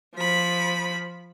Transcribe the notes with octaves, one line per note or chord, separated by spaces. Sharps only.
F3 B5